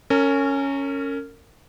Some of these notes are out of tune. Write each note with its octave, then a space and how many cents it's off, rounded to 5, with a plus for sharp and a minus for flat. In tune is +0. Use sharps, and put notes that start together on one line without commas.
C#4 +0 A#4 -35